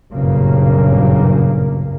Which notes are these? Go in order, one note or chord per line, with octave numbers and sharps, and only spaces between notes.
F#1 B1 G2 A#2 C#3 A#3